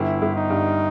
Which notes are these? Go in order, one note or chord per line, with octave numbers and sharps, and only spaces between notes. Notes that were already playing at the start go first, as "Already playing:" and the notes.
Already playing: G1 E4
G1
D#4
G2